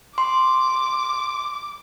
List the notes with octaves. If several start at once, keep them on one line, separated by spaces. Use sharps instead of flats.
C6 D6